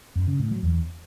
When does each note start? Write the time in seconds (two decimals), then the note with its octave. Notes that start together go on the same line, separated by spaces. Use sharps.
0.16 F#2
0.27 C#3
0.39 A2
0.51 F#3
0.63 E2